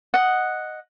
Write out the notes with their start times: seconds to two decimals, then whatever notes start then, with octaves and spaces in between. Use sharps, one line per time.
0.14 D#5 F#5